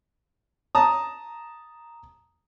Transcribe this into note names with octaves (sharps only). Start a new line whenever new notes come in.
A5 A#5 D#6